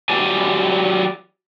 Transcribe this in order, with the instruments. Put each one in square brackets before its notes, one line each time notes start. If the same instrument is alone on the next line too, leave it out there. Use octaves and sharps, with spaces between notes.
[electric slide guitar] F#3 G4 D5 G#5